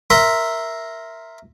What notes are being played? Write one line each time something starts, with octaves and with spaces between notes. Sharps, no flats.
A#4 E5 C6